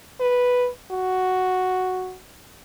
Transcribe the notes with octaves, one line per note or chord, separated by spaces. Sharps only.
B4
F#4